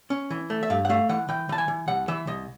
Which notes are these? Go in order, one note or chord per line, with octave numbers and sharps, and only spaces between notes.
C#4
E3
A3
E5
G2 F5
F#5
A3 F5
E3 F#5
E3 G5
E3 A5
G#5
E3
C2 F#5
E3 E5
C2 D#5